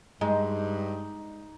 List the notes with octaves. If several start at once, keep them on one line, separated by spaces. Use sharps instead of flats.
G2 G#3 D#4